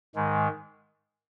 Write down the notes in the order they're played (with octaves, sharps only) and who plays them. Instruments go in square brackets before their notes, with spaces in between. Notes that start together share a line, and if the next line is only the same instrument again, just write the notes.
[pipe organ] G#2 D#3 G#3